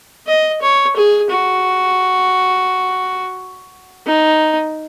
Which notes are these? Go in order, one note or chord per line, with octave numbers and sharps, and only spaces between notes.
D#5
C#5
G#4
F#4
D#4